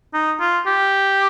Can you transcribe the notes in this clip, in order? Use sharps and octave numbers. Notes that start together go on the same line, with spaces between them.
D#4
F4
G4